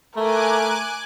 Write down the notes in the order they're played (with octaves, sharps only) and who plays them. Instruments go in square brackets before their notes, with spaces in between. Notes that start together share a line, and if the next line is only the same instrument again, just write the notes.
[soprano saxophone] A3 [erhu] A#4 [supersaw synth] G#5 D6 F#6